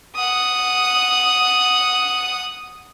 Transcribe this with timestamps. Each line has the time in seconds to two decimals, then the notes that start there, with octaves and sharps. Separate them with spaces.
0.16 F#5 D#6